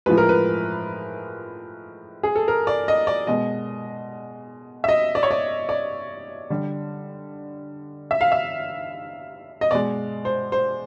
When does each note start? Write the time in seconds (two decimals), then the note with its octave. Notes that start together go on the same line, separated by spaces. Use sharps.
0.06 A2 F3 G#3 B4
0.18 A#4
0.29 B4
2.23 G#4
2.36 A4
2.48 A#4
2.67 D5
2.88 D#5
3.07 D5
3.27 B2 G#3 D#5
4.84 E5
4.88 D#5
5.15 D5
5.23 C#5
5.31 D5
5.69 D5
6.50 D3 G3
8.11 E5
8.21 F5
8.32 E5
9.61 D#5
9.71 B2 G#3 D5
10.25 C5
10.52 C5